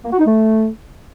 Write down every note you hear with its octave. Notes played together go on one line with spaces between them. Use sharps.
A#3
F#4
D#4
A3